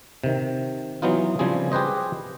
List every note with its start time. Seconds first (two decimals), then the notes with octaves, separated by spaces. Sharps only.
0.24 C3 D#3
1.02 E3 F#3 B3 D#4 F4
1.39 C#3 F3 G3 C4 G#4
1.72 G4 G#4 B4 C5 D#5